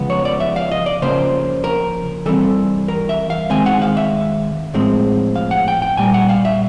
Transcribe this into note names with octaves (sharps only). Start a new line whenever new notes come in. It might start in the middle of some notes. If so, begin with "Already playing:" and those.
Already playing: C#3 F3 G#3 B3
C#5
D5
E5
F5
D#5
D5
C#3 F3 A#3 C#4 C5
A#4
E3 G3 C4 A4
A#4
E5
F5
D#3 G#3 C4 G#5
F#5
F5
E5
A2 F3 G#3 C4
F5
F#5
G5
G5
A#2 G3 A#3 G#5
F#5
F5
E5